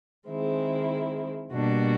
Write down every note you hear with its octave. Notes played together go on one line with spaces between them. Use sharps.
D#3 G#3 C4 E4
B2 G3 A#3 D4 F#4